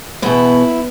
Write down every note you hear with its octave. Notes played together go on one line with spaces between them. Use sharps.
E2 B2 E4